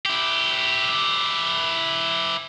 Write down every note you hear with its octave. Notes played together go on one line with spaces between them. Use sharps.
E4 G4